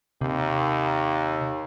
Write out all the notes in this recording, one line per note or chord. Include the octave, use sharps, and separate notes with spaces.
D#2 C3